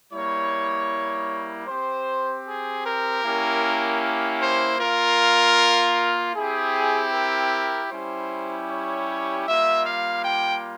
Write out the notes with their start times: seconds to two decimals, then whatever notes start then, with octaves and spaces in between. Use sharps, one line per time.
0.12 G3 A#3 E4 C#5
1.67 C4 G4 C5
2.45 G#4
2.84 A#4
3.23 A#3 C#4 E4 G4
4.40 C5
4.79 A#3 F4 A#4
6.35 C4 E4 G4 G#4
7.12 A#4
7.90 G3 C#4 E4 G4 C5
8.68 C#5
9.46 G3 A#3 F4 E5
9.85 F5
10.24 G5